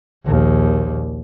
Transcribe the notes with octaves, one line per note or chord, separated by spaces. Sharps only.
A#1 D#2